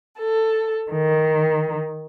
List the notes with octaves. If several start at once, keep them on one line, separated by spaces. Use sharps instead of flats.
A4
D#3